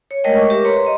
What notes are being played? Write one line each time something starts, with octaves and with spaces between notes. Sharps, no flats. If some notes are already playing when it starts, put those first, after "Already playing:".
C#5
G#3 A3 A#4 C#5 D#5 G5
C#6 D6
G4 A#4 E5
B4 C#5 A#5 C6
D#5 A#5 C6